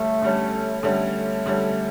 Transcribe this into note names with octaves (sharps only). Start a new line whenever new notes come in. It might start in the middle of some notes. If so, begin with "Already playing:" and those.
Already playing: D3 G3 A3 C#4
D3 G3 C#4
D3 G3 A3 C#4
D3 G3 C#4